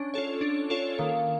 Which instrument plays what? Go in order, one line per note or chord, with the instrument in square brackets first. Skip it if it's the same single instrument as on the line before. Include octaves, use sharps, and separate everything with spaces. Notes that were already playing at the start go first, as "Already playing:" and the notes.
Already playing: [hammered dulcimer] C#4 [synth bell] D4
[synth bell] F4 A4 C#5
D4
F4 A4 C#5
[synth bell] D#3 [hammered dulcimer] A#3